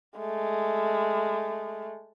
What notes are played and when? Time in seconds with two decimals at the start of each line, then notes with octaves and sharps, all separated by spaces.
0.18 G#3 A3